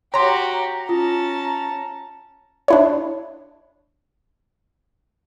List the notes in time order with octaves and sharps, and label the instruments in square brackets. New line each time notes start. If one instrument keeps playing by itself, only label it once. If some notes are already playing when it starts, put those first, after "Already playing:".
[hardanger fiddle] F#4 G4 [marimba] C#5 C6 [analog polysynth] A#5
[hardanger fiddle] C#4 A5 [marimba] F4
[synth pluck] D4 E4 C#5